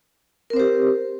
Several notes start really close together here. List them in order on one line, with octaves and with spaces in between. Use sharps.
A#4 C4 C5 G4